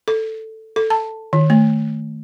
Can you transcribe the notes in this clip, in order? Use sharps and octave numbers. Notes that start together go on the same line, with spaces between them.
A4
A4
A5
D#3
A3